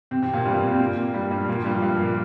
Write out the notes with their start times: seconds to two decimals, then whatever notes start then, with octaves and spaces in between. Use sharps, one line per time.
0.11 C3 C4
0.22 C3 C4
0.33 A#2 A#3
0.45 G2 G3
0.54 A#2 A#3
0.71 C3 C4
0.79 A#2 A#3
1.14 G2 G3
1.30 G2 G3
1.48 A#2 A#3
1.59 F3
1.65 G2 G3
1.82 G2 G3
1.99 A#2 A#3